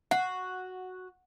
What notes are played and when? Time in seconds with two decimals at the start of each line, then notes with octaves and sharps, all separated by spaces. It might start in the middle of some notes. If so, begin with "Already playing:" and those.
0.11 F#4 F#5